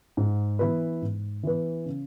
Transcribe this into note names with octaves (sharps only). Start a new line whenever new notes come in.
G#2
E3 B3 E4 B4
G#2
E3 B3 E4 B4
C#3